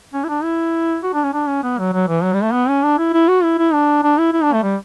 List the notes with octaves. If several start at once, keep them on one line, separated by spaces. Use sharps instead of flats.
C#4
E4
D4
E4
F#4
D4
C#4
D4
C#4
B3
F#3
F#3
E3
F#3
G3
A3
B3
C#4
D4
E4
E4
F#4
E4
E4
D4
D4
E4
E4
D4
A3
G3